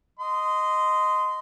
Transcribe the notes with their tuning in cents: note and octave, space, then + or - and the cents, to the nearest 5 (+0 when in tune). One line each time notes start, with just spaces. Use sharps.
D#5 +0 C6 -20